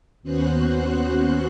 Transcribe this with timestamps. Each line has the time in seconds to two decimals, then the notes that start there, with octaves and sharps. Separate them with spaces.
0.23 D#2 B3 C#4 F#4 C5 F#6